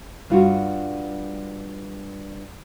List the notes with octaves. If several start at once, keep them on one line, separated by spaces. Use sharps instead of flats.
G2 F4 F#4